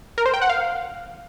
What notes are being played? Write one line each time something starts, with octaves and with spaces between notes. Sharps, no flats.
A#4
C5
G5
F#5
F5